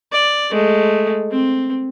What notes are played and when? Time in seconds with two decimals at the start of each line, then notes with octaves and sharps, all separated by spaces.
0.12 D5
0.51 G#3 A3
1.31 C4